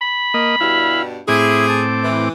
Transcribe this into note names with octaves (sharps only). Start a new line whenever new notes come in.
B5
A#3 D#5
G2 B2 G3 E4 F5
A2 C4 E4 G#4 D6
A5
E3